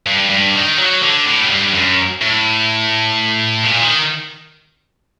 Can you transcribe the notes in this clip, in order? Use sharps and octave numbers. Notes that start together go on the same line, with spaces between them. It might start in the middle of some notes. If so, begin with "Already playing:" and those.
G2
G2
D#3
F#3
D3
A2
F#2
G2
F#2
A2
A#2
D#3